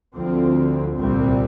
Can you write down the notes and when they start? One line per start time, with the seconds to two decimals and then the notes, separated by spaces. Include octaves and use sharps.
0.15 D2 D3 F3 C4
0.98 C2 A#2 G3 C4